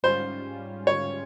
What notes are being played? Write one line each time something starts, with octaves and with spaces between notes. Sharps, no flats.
G#2 G3 C#4 F4 C5
C#5